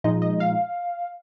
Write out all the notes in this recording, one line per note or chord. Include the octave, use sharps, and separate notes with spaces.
A#2 F3 G#3 D#4 D#5
D#5
F5